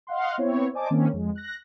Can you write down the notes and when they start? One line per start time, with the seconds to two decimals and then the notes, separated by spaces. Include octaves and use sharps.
0.07 D#5 F5 F#5 C6
0.38 B3 C4 E4 C#5
0.73 C5 D5 D#5 G#5 A5 D6
0.90 D#3 A#3 C4 C#4
1.13 F2 G#3
1.35 F#6 A#6